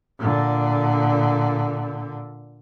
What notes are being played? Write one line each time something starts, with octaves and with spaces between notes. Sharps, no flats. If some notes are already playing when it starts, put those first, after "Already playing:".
A#2 D3